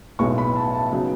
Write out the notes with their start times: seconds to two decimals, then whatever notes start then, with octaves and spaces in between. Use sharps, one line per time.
0.19 B1 A2 G#3 B3 C#6
0.38 B5
0.56 A5
0.73 A5
0.92 C#3 F#3 B3 D#4